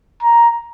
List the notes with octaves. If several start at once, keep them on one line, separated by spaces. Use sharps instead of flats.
A#5